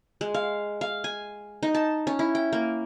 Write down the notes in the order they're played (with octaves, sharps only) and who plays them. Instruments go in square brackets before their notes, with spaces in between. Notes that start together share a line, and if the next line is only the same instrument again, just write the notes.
[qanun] G#3
F5
F5
G#5
D#4
A5
C#4
E4
G5
A#3